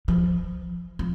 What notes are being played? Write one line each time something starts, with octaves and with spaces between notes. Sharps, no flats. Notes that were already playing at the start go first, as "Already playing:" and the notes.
F3
F3